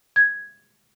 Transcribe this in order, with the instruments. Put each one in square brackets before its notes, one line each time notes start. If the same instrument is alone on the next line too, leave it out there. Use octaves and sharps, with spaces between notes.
[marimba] G#6